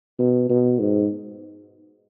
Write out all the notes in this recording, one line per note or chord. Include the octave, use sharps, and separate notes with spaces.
B2
B2
G#2